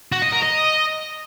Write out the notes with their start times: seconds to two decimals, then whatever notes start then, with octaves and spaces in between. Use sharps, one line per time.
0.12 F#4
0.22 D#5
0.32 A#4
0.43 D#5